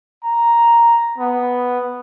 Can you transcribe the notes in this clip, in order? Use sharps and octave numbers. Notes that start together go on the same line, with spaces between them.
A#5
B3